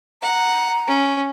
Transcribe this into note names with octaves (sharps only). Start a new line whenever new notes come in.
F#5 A#5
C#4